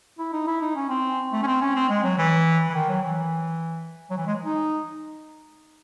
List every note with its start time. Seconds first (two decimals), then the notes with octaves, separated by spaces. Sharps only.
0.18 E4
0.33 D#4
0.47 E4
0.61 D#4
0.75 C#4
0.89 C4
1.32 A3
1.43 C#4
1.46 C4
1.61 C#4
1.75 C4
1.89 G#3
2.03 F#3
2.18 E3
2.69 E3
2.74 D#3
2.89 F#3
3.03 E3
4.11 F#3
4.17 E3
4.26 G#3
4.45 D#4